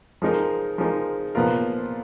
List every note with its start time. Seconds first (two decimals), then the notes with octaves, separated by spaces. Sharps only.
0.22 F3 G#3 D#4 A#4
0.78 F3 G#3 D#4 A#4
1.35 A#2 F3 B3 F4 A#4